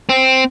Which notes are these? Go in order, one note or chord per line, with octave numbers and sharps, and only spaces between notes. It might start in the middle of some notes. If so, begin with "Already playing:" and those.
C4